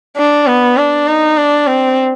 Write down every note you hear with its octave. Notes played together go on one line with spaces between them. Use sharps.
D4
B3
D4
D#4
D4
C4